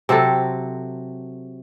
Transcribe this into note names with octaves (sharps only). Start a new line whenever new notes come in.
C3 F#3 C4 A4